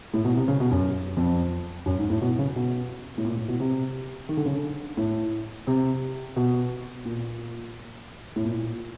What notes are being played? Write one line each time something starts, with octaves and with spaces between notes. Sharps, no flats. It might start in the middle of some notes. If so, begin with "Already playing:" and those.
A2
B2
C3
C#3
B2
F#2
F2
F#2
G#2
A2
B2
C#3
B2
A2
A#2
A2
B2
C3
D#3
D3
C#3
D3
A2
C3
B2
A#2
A2
A#2